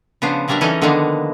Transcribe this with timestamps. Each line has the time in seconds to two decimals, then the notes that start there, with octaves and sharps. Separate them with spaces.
0.22 C#3 F3 B3 D4 C5
0.48 C#3 F#3 G3 D4 A#4 E5
0.61 E3 C#4 D#4 A4 A#4 D#5
0.82 D3 D#3 F3 G#3 A#3 B3